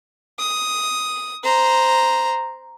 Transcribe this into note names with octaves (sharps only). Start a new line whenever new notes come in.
D#6
C5 A#5